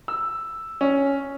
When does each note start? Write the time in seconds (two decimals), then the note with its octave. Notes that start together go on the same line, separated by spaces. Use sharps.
0.08 E6
0.81 C#4